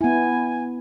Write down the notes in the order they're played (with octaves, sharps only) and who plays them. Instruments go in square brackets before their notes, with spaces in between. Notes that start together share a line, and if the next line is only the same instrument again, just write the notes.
[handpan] B3 E4 [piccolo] G#5